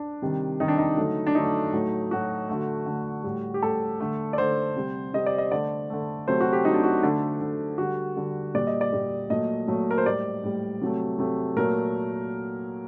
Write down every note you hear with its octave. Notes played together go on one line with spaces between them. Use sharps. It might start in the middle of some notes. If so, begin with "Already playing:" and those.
Already playing: D4
C3 D#3 G3
C3 D#3 G3 D#4
D4
D#4
D3 F#3 A3
D4
D3 F#3 A3 D#4
A2 F#3 A3
A2 F#3 A3 F#4
D3 A3
D3 A3
A2 G3
G4
A2 G3 A4
D3 A3
D5
D3 A3 C5
C3 G3
C3 G3 D#5
D5
D#5
D3 A3 D5
D3 A3
C3 F#3 A3 C5
F#4
G4
C3 F#3 A3 D#4
D4
F#4
D3 A3 D4
D3 A3
D3 G3 F#4
D3 G3
A#2 G3 D5
D#5
D5
A#2 G3
A#2 F#3 A3 D#5
A#2 F#3 A3
A#4
C5
A2 G3 D5
A2 G3
C3 F#3 A3
C3 F#3 A3
A#2 F#3 A3 A#4